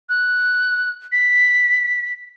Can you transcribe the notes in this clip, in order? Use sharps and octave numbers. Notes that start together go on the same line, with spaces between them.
F#6
B6